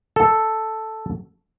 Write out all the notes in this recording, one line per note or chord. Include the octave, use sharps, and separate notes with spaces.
A4